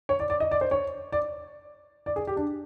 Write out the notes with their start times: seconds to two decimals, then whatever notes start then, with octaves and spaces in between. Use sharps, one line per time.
0.09 C#5
0.20 D5
0.30 D5
0.40 D#5
0.51 D5
0.61 C5
0.71 C#5
1.12 D5
2.06 D5
2.16 G#4
2.27 G4
2.37 D4